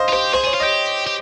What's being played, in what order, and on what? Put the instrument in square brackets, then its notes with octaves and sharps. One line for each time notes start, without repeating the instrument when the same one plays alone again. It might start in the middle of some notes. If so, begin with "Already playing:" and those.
Already playing: [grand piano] C5 D#5 F5
[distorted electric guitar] F4
[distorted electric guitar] G4 [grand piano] C5
[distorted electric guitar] G#4 [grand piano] C5
[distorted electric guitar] G#4 [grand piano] C#5
[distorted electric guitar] F4
[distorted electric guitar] G4 [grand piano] D#5
[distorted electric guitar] G4